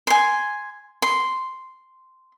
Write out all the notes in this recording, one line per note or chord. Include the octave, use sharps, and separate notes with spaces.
G#5 C6
C6